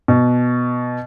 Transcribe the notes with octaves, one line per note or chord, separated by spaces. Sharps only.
B2